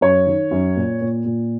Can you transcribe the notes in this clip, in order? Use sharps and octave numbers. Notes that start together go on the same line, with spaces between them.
F#2 C#5
D#3
F#2
A#2
A#2
A#2